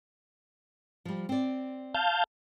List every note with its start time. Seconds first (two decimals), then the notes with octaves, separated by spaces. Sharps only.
1.05 F3 G3
1.29 C4 D5
1.95 F5 A5 G6